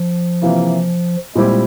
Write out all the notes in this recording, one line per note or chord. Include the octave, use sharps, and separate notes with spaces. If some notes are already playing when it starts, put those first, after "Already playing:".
Already playing: F3
C3 E3 A#3 F4
A#2 G3 G#3 C4 E4 G4